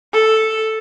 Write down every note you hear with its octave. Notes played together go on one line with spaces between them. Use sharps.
A4